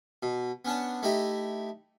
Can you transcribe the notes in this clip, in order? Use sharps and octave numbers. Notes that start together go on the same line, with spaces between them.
B2
B3 C#4 D4 A5
A3 D#4 E4 G4